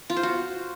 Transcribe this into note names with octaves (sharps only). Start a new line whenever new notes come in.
F4
C5
F#4